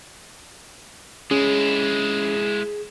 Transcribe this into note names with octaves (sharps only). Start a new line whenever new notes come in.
G#3 C#4 E4 G#4